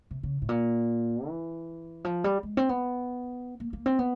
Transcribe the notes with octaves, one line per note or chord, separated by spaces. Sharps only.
C3
C#3
A2
A#2
E3
F3
G3
G#3
C4
B3
A#3
A#3
C4
B3